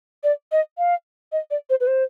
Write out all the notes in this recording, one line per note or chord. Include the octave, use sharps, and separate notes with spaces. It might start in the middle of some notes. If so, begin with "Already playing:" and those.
D5
D#5
F5
D#5
D5
C5
B4
C5